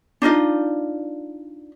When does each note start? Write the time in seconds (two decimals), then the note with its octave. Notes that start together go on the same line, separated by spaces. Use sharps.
0.22 D4 D#4 F4 D#5